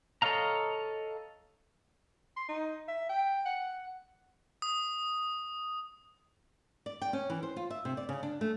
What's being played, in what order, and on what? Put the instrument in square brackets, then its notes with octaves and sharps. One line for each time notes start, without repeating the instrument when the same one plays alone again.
[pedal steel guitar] A4 C#5 D#5 F5 A#5
[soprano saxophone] C6
D#4
E5
G5
F#5
[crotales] D#6
[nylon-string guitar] D5
G5
C#4
E3
C5
F4
E5
C3
D5
C#3
D4
A3